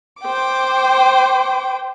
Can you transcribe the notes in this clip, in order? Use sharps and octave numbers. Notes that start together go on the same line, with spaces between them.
C5 G5 D6